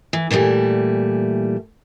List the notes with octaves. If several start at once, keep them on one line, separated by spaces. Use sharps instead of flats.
E3
A#2 E3 F3 G3 A3